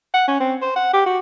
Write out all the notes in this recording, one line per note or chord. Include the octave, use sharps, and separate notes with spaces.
F#5
C#4
C4
C5
F#5
G4
F#4